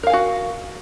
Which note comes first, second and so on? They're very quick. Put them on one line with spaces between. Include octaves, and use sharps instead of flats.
A#4 F5 G#5 F#4